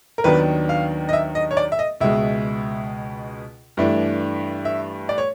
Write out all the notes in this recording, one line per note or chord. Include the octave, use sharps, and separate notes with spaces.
A#4
D#2 D#3 F#3 B3 D4 B4
F5
D#5
E5
D#5
C#5
D5
E5
D#5
C#2 B2 G#3 E5
G2 E3 A3 D4
E5
D5
C#5